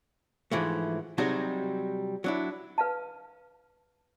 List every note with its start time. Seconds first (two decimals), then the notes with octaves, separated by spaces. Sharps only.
0.51 G#2 E3 F3 A3
1.18 C3 F#3 G3 D#4 F#4 G#4
2.24 F#3 D4 E4
2.78 B4 F5 A5